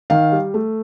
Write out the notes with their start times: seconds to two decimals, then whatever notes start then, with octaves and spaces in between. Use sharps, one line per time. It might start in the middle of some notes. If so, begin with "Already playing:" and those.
0.10 D#3 F5
0.32 G3
0.54 A3